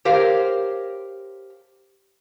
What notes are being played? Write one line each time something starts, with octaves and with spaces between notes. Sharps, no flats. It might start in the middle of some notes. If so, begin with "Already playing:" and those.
G4 A#4 C5 C#5 F5